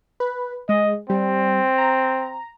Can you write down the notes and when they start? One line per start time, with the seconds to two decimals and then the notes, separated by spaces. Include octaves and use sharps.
0.20 B4
0.69 G#3 D#5
1.10 G3 C4
1.78 A#5